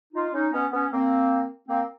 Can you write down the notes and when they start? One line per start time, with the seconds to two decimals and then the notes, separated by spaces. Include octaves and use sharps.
0.14 D#4 F4
0.33 C#4 D#4
0.52 B3 C#4
0.72 B3 C#4
0.91 A#3 C4
1.68 A#3 C4